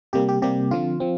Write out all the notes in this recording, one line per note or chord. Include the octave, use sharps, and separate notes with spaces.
C3 G3 A#3 G4
G4
C3 G3 A#3 G4
D3 F3 C4 F4
F3 C4